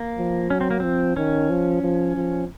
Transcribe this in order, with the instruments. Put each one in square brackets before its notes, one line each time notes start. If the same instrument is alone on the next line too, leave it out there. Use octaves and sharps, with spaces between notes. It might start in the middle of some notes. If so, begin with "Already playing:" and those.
Already playing: [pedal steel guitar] A#3
[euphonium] F3
[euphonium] F#3 [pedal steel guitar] C#4
[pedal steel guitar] C4
A#3
[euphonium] F3 [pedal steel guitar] C4
[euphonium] D#3 [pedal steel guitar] C#4
[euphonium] F3
F3
F3